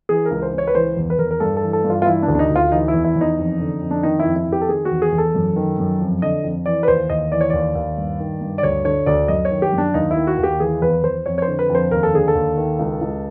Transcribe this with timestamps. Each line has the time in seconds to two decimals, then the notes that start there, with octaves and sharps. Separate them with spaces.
0.09 E3 G#4
0.26 A#4
0.31 C#2
0.42 C5
0.53 C#2
0.58 C#5
0.67 B4
0.75 E3 C5
0.97 E2
1.10 B4
1.19 E2 A#4
1.31 A#4
1.40 G2 A4
1.57 A4
1.62 E3
1.73 A4
1.84 G2
1.90 F4
2.02 F4
2.06 E3 E4
2.23 D4
2.28 D2
2.35 D4
2.39 D#4
2.50 D2
2.56 F4
2.72 E3 D#4
2.88 E4
2.93 E2
3.05 E4
3.16 E2
3.21 D#4
3.38 F2
3.60 D3
3.81 F2
3.91 D4
4.03 D#3 D#4
4.20 E4
4.25 F2
4.36 E4
4.47 F2
4.52 G4
4.61 A4
4.69 D#3 G#4
4.85 F#4
4.91 E2
5.02 G#4
5.12 E2
5.18 A4
5.35 F#2
5.56 D#3
5.79 F#2
6.00 F2
6.22 D3 D#5
6.44 F2
6.66 E3 D5
6.83 B4
6.88 D#2 C5
7.10 D#2 D#5
7.32 E3 D5
7.41 C#5
7.50 D#2 D5
7.75 D#2
7.97 G2
8.19 D#3
8.41 G2
8.58 D5
8.63 D2 C#5
8.85 D3 C#5
9.06 D2 D5
9.28 F#2 D#5
9.45 C#5
9.51 D#3
9.62 G4
9.72 F#2
9.78 D4
9.94 D#2 D#4
10.11 E4
10.16 D#3
10.27 F#4
10.38 D#2
10.43 G4
10.60 E3 G#4
10.82 E2 B4
11.03 E2 C5
11.26 F2 C#5
11.38 C#5
11.42 C5
11.47 D3
11.59 B4
11.69 F2
11.75 C5
11.91 D#2 A#4
12.03 A4
12.13 D3 G#4
12.28 A4
12.35 D#2
12.57 D#3
12.79 C#2
13.01 C#2